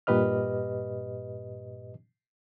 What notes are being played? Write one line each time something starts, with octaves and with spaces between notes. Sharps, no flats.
G2 A#2 G4 B4 D#5 F6